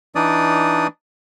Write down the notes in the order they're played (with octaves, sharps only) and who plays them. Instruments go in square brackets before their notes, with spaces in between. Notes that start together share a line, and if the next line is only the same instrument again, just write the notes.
[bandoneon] E3 D4 D#4 D5 D#6